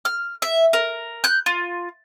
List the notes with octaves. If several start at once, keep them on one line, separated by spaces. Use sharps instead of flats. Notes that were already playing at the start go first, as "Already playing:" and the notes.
F6
E5
A#4
F#6 G6
F4